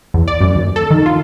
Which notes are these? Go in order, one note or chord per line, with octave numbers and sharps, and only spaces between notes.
E2
D5
F#2
D#2
A4
D#3
F4